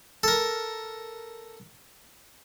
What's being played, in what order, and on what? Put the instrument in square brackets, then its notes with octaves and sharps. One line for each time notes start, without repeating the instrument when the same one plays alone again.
[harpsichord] A4 A#4